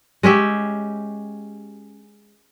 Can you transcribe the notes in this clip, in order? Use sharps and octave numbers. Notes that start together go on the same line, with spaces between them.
G#3 C#4 G4 E5